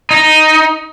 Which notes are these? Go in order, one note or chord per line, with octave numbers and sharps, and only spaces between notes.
D#4